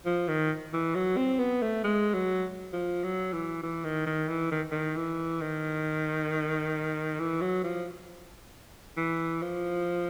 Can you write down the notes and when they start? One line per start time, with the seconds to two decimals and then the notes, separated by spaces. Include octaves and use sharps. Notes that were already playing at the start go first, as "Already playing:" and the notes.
0.06 F3
0.28 D#3
0.73 E3
0.95 F#3
1.17 C4
1.39 B3
1.62 A3
1.84 G#3
2.14 F#3
2.73 F3
3.04 F#3
3.33 E3
3.63 E3
3.85 D#3
4.06 D#3
4.29 E3
4.52 D#3
4.71 D#3
4.96 E3
5.41 D#3
7.19 E3
7.41 F#3
7.64 F3
8.97 E3
9.42 F3